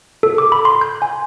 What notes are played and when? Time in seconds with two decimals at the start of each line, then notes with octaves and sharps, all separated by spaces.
0.23 A4
0.38 D6
0.52 B5
0.65 C6
0.81 G6
1.02 G#5